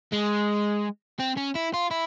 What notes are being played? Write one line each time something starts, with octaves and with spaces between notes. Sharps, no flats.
G#3
C4
C#4
E4
F4
E4